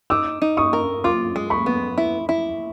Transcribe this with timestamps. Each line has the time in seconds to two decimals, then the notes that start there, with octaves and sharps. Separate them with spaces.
0.10 D#4 D6 E6
0.42 D#4
0.57 C#6 D#6
0.73 A#4
1.04 F4 C6 D6
1.36 G#3
1.50 B5 C#6
1.66 B3
1.98 E4
2.29 E4